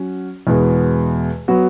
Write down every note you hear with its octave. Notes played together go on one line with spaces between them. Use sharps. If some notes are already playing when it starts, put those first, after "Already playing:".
Already playing: F#3 C#4 F#4
E2 B2 G#3
F#3 B3 F#4